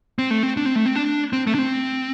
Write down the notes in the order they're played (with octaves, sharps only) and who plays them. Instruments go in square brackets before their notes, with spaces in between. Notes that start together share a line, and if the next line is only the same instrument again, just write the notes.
[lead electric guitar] C4
A3
C4
D4
C4
A3
C4
D4
C4
A3
D4
C4